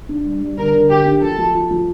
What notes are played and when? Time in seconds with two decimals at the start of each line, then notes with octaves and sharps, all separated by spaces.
0.09 D4
0.25 G3
0.41 G3
0.57 D3 A#4
0.74 D3
0.90 D3 G4
1.06 D4
1.22 F3 A4
1.38 F3
1.55 F4
1.71 F3